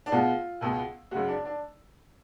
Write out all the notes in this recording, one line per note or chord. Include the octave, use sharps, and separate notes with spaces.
D4
B2 G#3 B3 F4
C#2 B2 G#3 B3
F#2 C#3 G#3 F#4
D4
D4